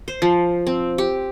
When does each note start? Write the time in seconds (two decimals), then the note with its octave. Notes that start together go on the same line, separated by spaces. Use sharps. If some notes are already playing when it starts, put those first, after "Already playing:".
0.08 C5
0.22 F3
0.67 C4
0.98 G4